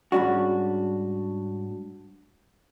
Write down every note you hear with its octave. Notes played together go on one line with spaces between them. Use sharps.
G#2 G3 C#4 D4 F#4